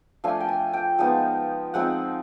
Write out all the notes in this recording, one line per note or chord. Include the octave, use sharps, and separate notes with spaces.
F3 A3 D4 F4 G#5
G5
G#5
G5
F3 G#3 B3 D#4
F3 G#3 C4 D#4 F#5